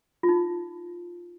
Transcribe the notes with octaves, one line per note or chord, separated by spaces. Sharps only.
F4
D#4